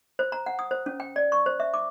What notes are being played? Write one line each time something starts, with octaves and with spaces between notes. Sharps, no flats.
C5
A#5
F#5
D#6
C5
C#4
G5
D5
C#6
C5
E5
D6